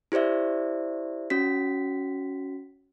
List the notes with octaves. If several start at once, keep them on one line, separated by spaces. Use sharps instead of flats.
E4 G4 C5 D5 E5
C#4 F#4 B6